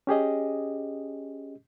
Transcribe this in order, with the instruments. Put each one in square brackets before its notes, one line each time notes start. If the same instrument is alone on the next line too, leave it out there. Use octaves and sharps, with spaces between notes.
[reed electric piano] C#4 G4 G#4 D#5